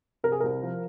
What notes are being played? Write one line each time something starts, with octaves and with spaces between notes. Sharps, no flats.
C3 A#4
G#4
C2 A#4
F3